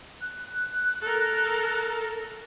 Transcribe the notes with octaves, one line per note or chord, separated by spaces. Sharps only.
F#6
A4 A#4